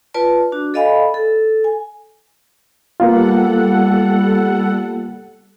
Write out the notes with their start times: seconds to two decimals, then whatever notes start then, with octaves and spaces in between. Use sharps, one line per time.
0.14 F4 B4 D5 A5
0.52 D4 F#4
0.74 A4 D5 D#5 F5 G#5 B5
1.14 A4
1.64 G#5
3.00 G3 A#3 B3 F4 A4 F#5